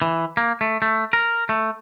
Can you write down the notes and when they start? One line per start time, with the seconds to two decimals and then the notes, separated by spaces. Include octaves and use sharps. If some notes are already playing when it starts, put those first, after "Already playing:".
0.02 E3
0.37 A#3
0.61 A3
0.82 A3
1.13 A#4
1.49 A3